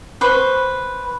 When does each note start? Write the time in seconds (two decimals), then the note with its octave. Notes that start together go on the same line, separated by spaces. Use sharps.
0.21 B4 C5 C#6